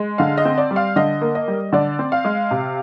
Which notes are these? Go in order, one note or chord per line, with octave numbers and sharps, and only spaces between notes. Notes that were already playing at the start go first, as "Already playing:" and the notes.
Already playing: G#3
D3 F5
D#5
C4
D5
G3
F5
D3 D#5
A#3
D#5
G3
D3 D5
C4
F5
G#3
C3